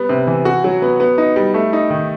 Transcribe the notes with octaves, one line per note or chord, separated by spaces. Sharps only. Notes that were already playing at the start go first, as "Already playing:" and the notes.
Already playing: G3 B3
C3
E3
F#4
F#3
B3
B3
D#4
G3
A3
D#4
D#3